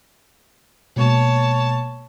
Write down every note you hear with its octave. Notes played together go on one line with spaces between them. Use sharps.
B2 G#3 A#3 C#5 A5